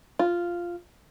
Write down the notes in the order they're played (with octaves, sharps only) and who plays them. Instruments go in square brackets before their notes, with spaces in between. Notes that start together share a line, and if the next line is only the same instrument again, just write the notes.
[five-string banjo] F4